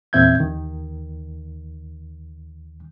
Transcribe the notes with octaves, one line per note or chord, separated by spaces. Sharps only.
E2 A#2 C4 E5 G6 G#6
D#2 D#3